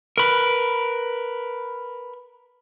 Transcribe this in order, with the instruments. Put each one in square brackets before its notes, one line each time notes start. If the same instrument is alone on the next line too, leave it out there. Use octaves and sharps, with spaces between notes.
[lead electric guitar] A#4 B4